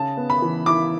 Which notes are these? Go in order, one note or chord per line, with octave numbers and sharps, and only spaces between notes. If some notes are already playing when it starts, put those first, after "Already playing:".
Already playing: C#3 A5
B3
B5
E3
E4 D6